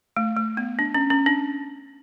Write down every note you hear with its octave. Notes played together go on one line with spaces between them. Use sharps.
A3
A3
B3
D4
C#4
C#4
D4